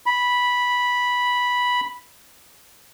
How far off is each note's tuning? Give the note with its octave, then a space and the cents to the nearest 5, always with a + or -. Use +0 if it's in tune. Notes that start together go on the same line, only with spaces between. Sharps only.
B5 -10